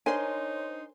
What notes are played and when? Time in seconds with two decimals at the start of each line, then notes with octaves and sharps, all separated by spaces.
0.06 D4 D#4 A#4 C5 C#5 G#5 C6